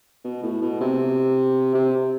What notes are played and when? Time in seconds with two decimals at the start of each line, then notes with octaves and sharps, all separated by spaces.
0.24 B2
0.43 A2
0.61 B2
0.80 C3
1.74 C3